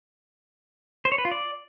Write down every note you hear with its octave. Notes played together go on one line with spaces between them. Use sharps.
C5
C#5
B4
F4
D5